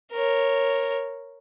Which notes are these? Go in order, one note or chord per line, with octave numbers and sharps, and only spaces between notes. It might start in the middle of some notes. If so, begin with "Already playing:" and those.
A#4 C#5